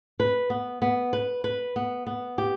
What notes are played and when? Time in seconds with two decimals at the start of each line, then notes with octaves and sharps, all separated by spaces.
0.20 B4
0.50 B3
0.82 B3
1.13 B4
1.44 B4
1.76 B3
2.07 B3
2.38 G4